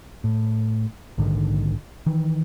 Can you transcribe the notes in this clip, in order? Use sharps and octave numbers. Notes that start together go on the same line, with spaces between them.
A2
A#1 G#2 D3 D#3
D#3 E3